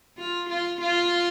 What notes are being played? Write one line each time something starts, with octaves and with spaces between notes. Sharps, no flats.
F4
F4
F4